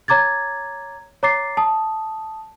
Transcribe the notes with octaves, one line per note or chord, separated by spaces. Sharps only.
C#5 A#5 D6 G#6 A6
C#5 A#5 D6 A6 C7
A5 D#6